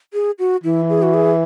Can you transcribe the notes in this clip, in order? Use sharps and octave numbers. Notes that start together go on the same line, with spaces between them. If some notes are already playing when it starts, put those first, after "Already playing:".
G#4
F#4
E3 E4
G#4
F#4
G#4